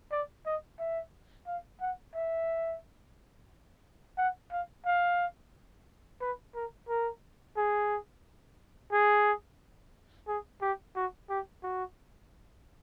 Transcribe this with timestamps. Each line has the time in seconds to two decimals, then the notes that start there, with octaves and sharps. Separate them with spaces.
0.12 D5
0.46 D#5
0.79 E5
1.47 F5
1.81 F#5
2.15 E5
4.18 F#5
4.52 F5
4.86 F5
6.21 B4
6.55 A#4
6.89 A#4
7.57 G#4
8.92 G#4
10.28 G#4
10.62 G4
10.96 F#4
11.30 G4
11.63 F#4